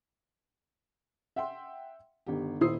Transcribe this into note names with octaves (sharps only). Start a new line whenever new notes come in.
E5 F#5 G5 C6
G1 D#3 G4
D#1 D#3 E4 C5 D#6 C7